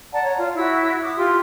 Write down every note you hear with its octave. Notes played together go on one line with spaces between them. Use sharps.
D5 F#5 A5 A#5
C#5 A#5
F4
E4 F#4 E5 E6
D6 D#6
F4 G4 C6